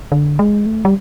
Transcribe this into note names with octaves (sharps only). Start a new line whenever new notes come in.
D3
G#3
A3
G3